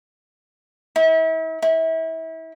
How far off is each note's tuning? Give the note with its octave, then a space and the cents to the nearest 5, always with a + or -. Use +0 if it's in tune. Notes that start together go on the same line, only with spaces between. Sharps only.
E4 -40
E4 -30